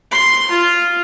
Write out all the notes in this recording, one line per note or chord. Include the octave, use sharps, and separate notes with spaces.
C6
F4